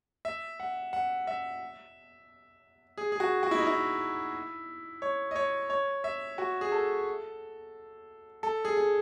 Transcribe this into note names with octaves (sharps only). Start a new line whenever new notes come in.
E5
F#5
F#5
E5
G#4
G#4
F#4
F#4
E4
D#4
E4
C#5
D#5
C#5
C#5
E5
F#4
G#4
A4
A4
G#4
G#4